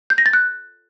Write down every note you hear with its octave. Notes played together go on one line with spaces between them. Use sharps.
G6
A#6
A6
F#6